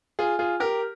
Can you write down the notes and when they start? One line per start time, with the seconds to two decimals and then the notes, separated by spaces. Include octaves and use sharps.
0.19 F4 G#4
0.39 F4 G#4
0.60 G4 A#4